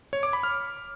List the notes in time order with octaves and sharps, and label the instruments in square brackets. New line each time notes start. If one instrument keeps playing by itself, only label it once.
[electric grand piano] C#5
D6
B5
F6